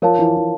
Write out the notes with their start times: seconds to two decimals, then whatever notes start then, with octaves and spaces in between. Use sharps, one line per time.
0.02 F3 A#4 C#5 F5 A5
0.19 E3
0.37 E3